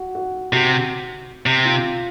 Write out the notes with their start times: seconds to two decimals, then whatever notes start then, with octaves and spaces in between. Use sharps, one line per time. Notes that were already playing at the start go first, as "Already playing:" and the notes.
Already playing: F#4
0.15 F#4
0.52 C3 F#4
1.46 C3
1.65 F4